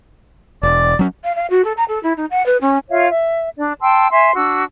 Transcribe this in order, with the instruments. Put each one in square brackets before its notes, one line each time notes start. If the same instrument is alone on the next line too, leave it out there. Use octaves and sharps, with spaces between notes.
[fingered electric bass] E1 [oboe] D5
[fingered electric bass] F#3 C#4
[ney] F5
F5
F#4
A4
A#5
A4
E4
D#4
F#5
B4
C#4
[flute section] F4 C#5 E5 F5
E5
D4 D5
G5 A5 C6 E6
E5 G#5 C6
D4 F#4 E6